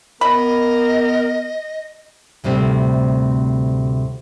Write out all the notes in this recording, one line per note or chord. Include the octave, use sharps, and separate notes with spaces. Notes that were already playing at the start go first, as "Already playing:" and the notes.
B3 A#4 D#5 B5
D2 A2 C3 G3 C4